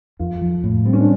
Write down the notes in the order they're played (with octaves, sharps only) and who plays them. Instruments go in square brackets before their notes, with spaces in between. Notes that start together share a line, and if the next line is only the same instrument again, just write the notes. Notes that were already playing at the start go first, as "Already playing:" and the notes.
[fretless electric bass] F2 [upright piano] F4
[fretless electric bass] F3
A2
[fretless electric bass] G3 [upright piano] C4
[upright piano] C#4
D4